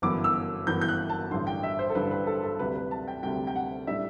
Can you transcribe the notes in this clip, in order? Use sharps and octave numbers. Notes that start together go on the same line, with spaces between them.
G1 F#2 E3 B3 E4 D6
E6
G1 F#2 E3 B3 E4 G6
G6
F#6
A5
A1 G2 D3 C6
G5
E5
C5
A4
A1 G2 D3 B4
B4
A4
A4
D2 C3 G3 B4
B4
A5
G5
D2 C3 G3 G5
G5
F#5
A2 G3 D4 E5